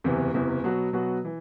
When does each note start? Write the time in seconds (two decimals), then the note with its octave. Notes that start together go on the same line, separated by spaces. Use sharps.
0.04 F#1 E2 C3 E3
0.34 F#1 E2 C3 E3
0.64 B2 F#3 B3 F#4
0.93 B2 F#3 B3 F#4
1.25 E3